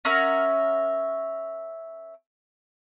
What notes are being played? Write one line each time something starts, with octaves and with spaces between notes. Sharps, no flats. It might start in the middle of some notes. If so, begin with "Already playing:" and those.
C#4 A#4 E5 F#5